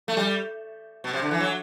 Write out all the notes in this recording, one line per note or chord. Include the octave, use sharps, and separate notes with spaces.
A3
G3
B2
C3
D3
E3
F#3